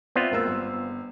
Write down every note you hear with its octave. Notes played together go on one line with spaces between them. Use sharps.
B3 C4 F4 D5 E5
E1 A#3 E6
G1